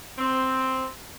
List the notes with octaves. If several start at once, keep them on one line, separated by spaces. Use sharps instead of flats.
C4